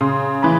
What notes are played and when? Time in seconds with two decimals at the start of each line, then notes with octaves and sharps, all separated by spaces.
0.01 C#3 C6
0.43 E3 B5